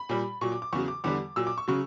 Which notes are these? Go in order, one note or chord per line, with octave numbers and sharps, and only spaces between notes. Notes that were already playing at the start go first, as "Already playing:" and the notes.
Already playing: B5
A#2 G3
A#2 F#3 C#6
D6
D6
E2 C#3 F#3 C#6
D6
E2 D3 G3 D6
A#2 F#3 E6
D6
C#6
C#3 F#3 C#6